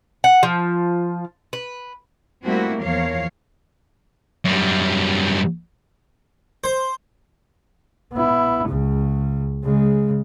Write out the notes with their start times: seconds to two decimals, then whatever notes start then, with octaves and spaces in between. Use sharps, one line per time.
0.24 F#5
0.43 F3
1.53 B4
2.45 G3 A3 A#3 C4 E4 F#4
2.84 E2 F3 A#4 C#5 F5
4.45 F#2 G3
6.64 C5
8.13 B3 E4
8.68 C#2 C#3
9.64 C#3 G#3